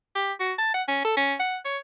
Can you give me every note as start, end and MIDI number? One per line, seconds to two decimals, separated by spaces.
0.15 0.33 67
0.40 0.53 66
0.58 0.72 81
0.74 0.82 78
0.88 1.01 61
1.04 1.16 69
1.17 1.35 61
1.40 1.57 78
1.65 1.78 73